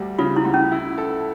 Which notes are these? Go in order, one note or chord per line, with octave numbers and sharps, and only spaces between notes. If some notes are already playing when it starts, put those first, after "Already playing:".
Already playing: D2 G3
C#3 F4
E4
D2
C#4
E4
A4